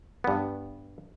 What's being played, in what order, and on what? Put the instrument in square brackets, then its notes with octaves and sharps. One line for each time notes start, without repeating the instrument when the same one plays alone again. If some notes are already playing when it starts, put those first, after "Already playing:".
[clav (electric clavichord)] G2 B3